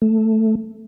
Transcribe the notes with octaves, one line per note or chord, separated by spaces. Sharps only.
A3